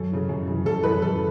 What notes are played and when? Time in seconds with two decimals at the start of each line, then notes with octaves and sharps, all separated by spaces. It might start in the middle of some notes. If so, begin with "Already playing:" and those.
Already playing: F#2 A4
0.11 C#3 E3
0.29 F#2
0.48 C#3 E3
0.65 F#2 A4
0.83 C#3 E3 B4
1.02 F#2 A4